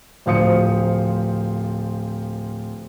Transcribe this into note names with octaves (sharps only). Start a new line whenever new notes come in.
D1 F3 C5 F5 D#6 C#7